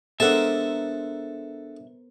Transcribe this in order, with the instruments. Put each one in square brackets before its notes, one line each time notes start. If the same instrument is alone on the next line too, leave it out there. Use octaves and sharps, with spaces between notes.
[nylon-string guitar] G#3 D4 [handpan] B3 A#4 C5 [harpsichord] A4 F#5 [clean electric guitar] E5